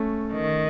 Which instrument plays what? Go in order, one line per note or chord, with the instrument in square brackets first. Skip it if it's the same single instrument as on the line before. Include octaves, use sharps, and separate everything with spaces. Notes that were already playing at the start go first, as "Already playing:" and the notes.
Already playing: [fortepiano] A3 C#4
[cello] D#3